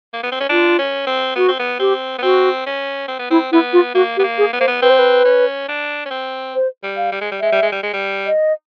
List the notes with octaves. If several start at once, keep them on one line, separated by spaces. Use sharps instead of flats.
A#3
B3
C4
C#4
D4 F4
C#4
C4
B3 F#4
C4
B3
C4 G4
B3
C4 F#4
C#4
C4
B3
C4 E4
B3 E4
F4
A#3 F#4
B3 G4
A#3
G#4
B3
A#3 C5
B3
C4 B4
C5
B4
C#4
D4
C#4
C4
C5
G3
F5
G3
G#3
G3
G#3 E5
G3
G#3
G3
G#3
G3
D#5